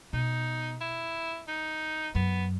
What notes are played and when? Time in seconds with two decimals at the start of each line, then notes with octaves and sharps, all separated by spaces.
0.13 B2 D#4
0.81 E4
1.48 D#4
2.15 F#2 B3